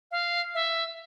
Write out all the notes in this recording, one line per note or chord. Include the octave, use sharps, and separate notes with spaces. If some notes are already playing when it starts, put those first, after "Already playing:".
F5
E5